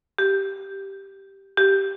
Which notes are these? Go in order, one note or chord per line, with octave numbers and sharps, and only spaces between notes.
G4
G4